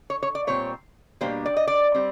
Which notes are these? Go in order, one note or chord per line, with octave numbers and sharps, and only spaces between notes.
C#5
C#5
D5
A#2 G3 C4 C#5
B2 G3 A#3 D4 C5
D5
D#5
D5
G3 C4